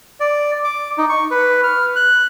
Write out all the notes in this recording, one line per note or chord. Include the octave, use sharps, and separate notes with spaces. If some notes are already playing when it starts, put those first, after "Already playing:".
D5
D6
D#4
C#6
B4
F6
F#6